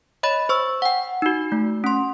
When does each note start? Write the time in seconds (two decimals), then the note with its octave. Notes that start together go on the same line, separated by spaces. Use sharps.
0.23 C#5 D#5 B5 A6
0.49 C5 C#6 E6
0.82 F#5 G5
1.22 D#4 F#4
1.52 A3
1.84 C#4 C6